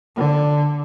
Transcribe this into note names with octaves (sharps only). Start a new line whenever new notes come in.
D3